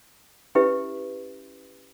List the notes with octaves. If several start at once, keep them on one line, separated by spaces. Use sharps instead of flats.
C#4 E4 G4 B4 E5